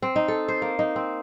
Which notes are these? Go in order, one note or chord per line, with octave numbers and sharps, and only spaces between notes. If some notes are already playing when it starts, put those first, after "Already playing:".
C4
D#4
A4
C5
A#3
D#4
C4